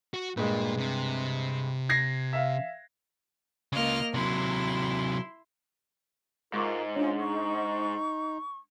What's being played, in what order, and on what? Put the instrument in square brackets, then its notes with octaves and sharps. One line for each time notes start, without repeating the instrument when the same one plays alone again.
[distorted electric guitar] F#4
[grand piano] G2 G#3 [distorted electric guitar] A#2 A#3
[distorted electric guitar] C3
[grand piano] G#6 A#6 C7
E5 F5
[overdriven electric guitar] C#3 F4 [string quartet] A#3 D#5 F6
[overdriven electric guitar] C3 F#3 [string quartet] E4 C6
[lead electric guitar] G#2 [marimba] G#3 C#6 D6 [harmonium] F4 A#4
[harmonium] C#4 F4 [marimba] D4 C#5
[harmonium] D#4 [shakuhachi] C#6